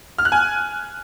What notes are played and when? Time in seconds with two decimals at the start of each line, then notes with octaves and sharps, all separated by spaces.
0.18 F6
0.25 F#6
0.32 G#5